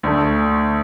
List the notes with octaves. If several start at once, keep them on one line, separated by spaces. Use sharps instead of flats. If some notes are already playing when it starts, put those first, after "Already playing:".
D2 D3 A3